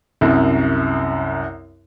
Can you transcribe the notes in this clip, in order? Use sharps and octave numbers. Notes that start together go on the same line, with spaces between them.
C2 F#2